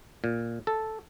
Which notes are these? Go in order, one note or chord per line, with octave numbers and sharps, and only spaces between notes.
A#2
A4